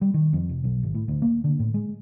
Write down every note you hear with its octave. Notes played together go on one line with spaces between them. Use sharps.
G3
D#3
F2
F1
B1
G#1
A2
D2
A#3
D3
A2
G#3